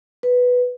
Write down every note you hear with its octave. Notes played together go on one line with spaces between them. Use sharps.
B4